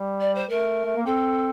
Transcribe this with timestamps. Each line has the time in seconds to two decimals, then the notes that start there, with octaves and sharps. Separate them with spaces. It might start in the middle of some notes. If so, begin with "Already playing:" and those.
Already playing: G3
0.21 D5
0.35 C5
0.49 A3 A#4
0.85 A3
0.96 A#3
1.06 C4 A4